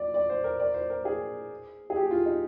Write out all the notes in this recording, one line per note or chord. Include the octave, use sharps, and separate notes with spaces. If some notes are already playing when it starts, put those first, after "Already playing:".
Already playing: D5
D5
C5
A#4
D5
C5
A#4
G#4
G#4
G4
F4
D#4